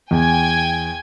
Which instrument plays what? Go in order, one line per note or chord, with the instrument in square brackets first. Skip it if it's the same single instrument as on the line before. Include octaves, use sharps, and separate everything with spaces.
[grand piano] E2 [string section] G5 G#5 G#6